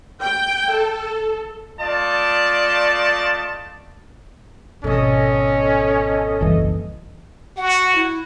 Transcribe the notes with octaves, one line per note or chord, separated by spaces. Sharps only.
G5
A4
A3 F4 D5 D#5 A5
G#1 B2 C#4 A4 D#5
F#1 C2 E3
F#4 F#5
E4